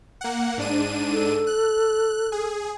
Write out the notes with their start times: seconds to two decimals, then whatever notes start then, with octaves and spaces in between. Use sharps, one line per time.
0.21 A#3 F#5
0.57 G#2 D4 D#7
1.13 A4
1.47 F#6
2.32 G#4